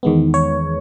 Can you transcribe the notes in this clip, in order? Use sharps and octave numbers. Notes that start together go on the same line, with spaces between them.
E2 D#3 G#3 B3
C#5